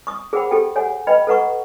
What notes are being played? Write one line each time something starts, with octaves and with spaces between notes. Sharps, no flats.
C#6 D#6
G#4 A#4 C5 F#5 G5 B5
G4 A4 G5
A4 C#5 F#5 G#5
B4 D#5 G5 B5
A4 B4 F#5 A#5 C#6